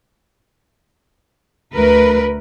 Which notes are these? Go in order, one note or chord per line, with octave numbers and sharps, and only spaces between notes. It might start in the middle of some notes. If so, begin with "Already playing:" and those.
D2 A3 A#4 B4